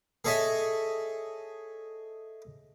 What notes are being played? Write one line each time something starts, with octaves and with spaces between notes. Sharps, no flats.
G#4 A4 C#5 D#5 E5 G#5